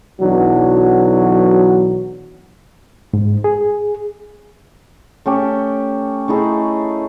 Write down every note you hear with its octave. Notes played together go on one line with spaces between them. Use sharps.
B1 E3 F#3 D4 F#4
G#2
G#4
A3 C#4 G4
A3 D#4 E4 G#4